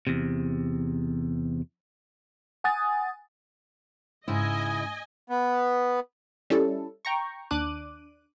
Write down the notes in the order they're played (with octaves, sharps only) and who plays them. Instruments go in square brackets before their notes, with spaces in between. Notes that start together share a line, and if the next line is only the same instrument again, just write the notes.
[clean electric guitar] E2 C3
[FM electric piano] F#5 G#5 D#6 A6
[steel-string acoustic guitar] G#2 C#3 E4 [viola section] D#5 G#5
[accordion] B3
[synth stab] G3 C#4 E4 A4
G5 A#5 C#6
D#2 D4 D6 F#6 D#7